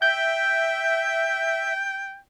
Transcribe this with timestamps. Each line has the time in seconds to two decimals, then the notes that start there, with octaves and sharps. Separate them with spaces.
0.02 E5 G5 G6